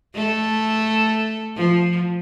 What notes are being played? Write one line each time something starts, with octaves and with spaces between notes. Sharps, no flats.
A3 A4
F3